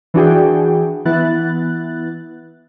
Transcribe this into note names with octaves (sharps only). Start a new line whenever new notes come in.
E3 D4 F#4 G#4 G5
E3 B3 E4 F#6 A6